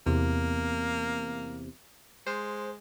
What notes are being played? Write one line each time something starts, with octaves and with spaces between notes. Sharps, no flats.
E2 C3 A#3
G#3 C5